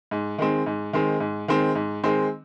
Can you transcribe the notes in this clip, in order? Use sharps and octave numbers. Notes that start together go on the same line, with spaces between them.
G#2
D#3 G#3 C4
G#2
D#3 G#3 C4
G#2
D#3 G#3 C4
G#2
D#3 G#3 C4